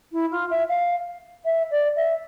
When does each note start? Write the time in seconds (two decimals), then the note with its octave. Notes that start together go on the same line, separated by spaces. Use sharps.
0.12 E4
0.32 F4
0.50 E5
0.69 F5
1.45 E5
1.71 D5
1.96 E5